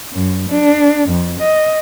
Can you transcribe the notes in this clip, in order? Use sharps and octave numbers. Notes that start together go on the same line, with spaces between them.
F#2
D4
F2
D#5